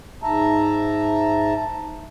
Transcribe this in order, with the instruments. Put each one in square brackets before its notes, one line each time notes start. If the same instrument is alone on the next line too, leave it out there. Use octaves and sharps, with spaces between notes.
[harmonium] G#2 E5 A5 A#5